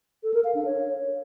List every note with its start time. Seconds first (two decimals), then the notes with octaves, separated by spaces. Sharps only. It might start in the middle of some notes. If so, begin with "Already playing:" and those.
0.23 A4
0.34 A#4
0.44 F5
0.55 D4
0.65 C#5